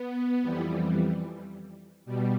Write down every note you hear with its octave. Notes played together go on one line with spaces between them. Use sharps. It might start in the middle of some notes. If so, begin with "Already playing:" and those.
Already playing: B3
F2 E3 G3
B2 G3